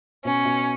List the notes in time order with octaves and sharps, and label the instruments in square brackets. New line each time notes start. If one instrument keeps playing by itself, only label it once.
[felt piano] B2 [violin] C#4
[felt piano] B2